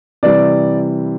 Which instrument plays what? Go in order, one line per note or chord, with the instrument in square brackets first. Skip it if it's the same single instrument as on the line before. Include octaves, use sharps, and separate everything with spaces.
[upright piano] C3 E3 G3 D5